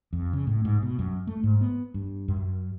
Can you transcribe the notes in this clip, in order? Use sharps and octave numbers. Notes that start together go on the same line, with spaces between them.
F2
C#3
A2
G#2
B2
F#2
A3
G#2
B3
G2
F#2